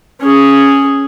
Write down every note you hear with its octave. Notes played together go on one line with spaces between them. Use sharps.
C#4 G#4